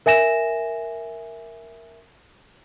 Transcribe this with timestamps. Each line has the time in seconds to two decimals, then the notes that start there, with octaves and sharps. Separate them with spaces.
0.06 A#4 E5 G#5 A#6 E7